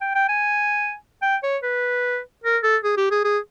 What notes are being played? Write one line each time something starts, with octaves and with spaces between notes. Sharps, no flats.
G5
G5
G#5
G5
C#5
B4
A#4
A4
G#4
G4
G#4
G#4